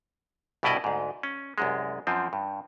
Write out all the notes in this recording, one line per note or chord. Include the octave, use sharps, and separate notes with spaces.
C2 G2 B2 E4 D5 D#5
D2 G#2
C#4
C2 F#2 G#3
F#2 F3 C4
G2